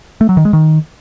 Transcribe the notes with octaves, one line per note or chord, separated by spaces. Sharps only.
A3
F#3
D#3
G#3
D#3